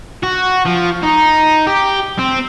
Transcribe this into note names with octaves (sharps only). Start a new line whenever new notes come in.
F#4
F3
D#4
G4
C4